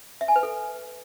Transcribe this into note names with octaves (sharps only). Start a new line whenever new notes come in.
E5
G#5
B4
A4